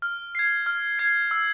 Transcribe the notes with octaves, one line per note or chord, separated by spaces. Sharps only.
F6
G#6 C7
F6
G#6 C7
E6